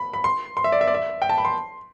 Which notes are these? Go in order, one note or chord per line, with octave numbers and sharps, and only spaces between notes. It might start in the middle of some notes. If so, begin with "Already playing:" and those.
Already playing: B5
B5
C6
C6
E5
D5
E5
D5
E5
G5
A5
B5
C6